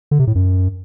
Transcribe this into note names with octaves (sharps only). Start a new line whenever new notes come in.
D3
C3
A2
F#2